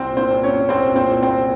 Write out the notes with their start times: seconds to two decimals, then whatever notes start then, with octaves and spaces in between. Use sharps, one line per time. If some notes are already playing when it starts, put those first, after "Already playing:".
Already playing: C2 C4 C5
0.10 A#2
0.17 C4 C5
0.31 A#2
0.44 C#4 C#5
0.50 C2
0.69 C2 C4 C5
0.90 A#2
0.96 C4 C5
1.09 A#2
1.23 C4 C5
1.29 C2